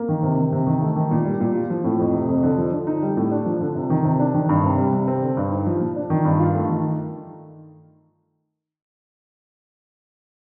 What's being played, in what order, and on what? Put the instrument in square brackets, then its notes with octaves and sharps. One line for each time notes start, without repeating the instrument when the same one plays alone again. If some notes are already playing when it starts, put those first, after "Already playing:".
Already playing: [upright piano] A#3
D#3
C3
D#3
C3
D#3
A3
D#3
A#2
G3
A#2
F4
F3
A2
F2
C3
F2
D3
F3
D3
D#4
G3
A2
D4
F3
D3
C3
D#3
C3
D4
D#3
G2
C3
G3
C3
C4
D3
G2
D#4
F3
A#2
D4
D#3
G2
F4
A3
D#3